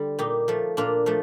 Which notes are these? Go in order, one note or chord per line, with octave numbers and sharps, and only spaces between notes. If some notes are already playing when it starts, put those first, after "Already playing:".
Already playing: D3 G3
A#2 D#4 G4
F3 A3
A#2 D4 F4
F3 A3